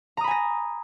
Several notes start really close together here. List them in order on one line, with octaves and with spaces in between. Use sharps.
A#5 D#6 B5 G#5 A#6